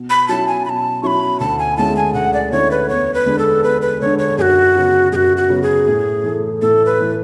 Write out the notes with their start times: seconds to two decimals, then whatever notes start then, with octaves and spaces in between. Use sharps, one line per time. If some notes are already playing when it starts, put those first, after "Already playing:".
Already playing: B2
0.10 B5
0.28 F#3 C#4 E4 A5
0.48 G#5
0.65 B2 A5 B5
1.03 F#3 C#4 E4 B5 C#6
1.40 D2 A5
1.59 G#5
1.77 D3 G#3 C#4 E4 A5
1.96 G#5
2.14 D2 F#5
2.34 D5
2.52 D3 G#3 C#4 E4 C#5
2.71 B4
2.89 E2 C#5
3.14 B4
3.26 D3 G#3 D4
3.39 A4
3.63 E2 B4
3.82 B4
4.01 D3 G#3 D4 C#5
4.19 C#5
4.38 F#2 G#4
4.42 F#4
4.75 C#3 F#3 B3
5.12 F#2 F#4 G#4
5.37 F#4
5.49 C#3 F#3 B3
5.63 G#4
5.87 A2
6.24 E3 A3
6.62 A2 A4
6.85 B4
6.99 E3 A3